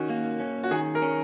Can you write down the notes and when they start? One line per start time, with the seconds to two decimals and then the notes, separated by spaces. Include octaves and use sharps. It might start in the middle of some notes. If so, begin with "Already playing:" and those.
Already playing: D#3 C#4 F#4
0.10 A#3
0.40 C#4
0.63 F#4
0.71 D#3 G#4
0.95 A#4
1.02 C#4